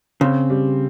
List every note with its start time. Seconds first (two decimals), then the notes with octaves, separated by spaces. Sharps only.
0.21 C#3 C4
0.50 G3